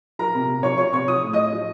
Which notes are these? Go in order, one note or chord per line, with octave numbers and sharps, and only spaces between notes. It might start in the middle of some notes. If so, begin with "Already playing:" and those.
F3 A#4 A#5
C3
C3
F3 C#5 C#6
F3 C#5 C#6
C3 C#5 C#6
F3 D#6
A2
A2 D#5 D#6
F3